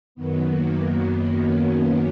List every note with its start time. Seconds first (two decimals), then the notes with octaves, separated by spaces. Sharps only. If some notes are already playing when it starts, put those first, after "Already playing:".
0.15 F#2 D#3 F#3 B3
0.47 A#3
1.39 C#4